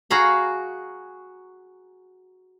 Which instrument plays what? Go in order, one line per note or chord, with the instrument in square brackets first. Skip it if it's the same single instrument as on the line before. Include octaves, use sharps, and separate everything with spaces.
[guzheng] F#4 G#4 F5 A#5 B5